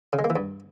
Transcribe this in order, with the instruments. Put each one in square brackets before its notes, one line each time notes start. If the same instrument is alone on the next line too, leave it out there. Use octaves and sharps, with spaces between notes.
[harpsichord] C#3
G#3
A#3
E3
G2